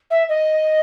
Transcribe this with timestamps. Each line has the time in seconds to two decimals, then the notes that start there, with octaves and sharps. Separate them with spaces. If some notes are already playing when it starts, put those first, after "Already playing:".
0.11 E5
0.29 D#5